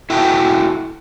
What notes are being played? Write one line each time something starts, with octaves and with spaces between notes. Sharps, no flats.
E4 F#4 A4 G5